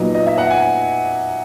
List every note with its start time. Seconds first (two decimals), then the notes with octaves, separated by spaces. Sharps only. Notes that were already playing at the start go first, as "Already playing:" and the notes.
Already playing: A#2 F#3 B3 D#4 D#5
0.15 D#5
0.26 E5
0.38 F#5
0.50 G#5